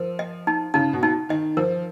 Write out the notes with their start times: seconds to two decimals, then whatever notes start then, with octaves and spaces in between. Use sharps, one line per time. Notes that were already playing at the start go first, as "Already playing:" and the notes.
Already playing: F3 A#4
0.19 D#5
0.47 D#4
0.74 C#3 D#4
0.93 B2
1.03 D#4
1.29 D#3 D#5
1.57 F3 A#4